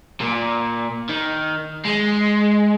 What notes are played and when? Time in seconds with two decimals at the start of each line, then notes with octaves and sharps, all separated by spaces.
0.20 A#2
1.09 D#3
1.85 G#3